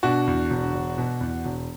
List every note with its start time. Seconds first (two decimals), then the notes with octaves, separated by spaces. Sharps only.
0.03 B2 D4 F#4
0.27 E2
0.50 E1
0.74 E1
0.98 B2
1.21 E2
1.45 E1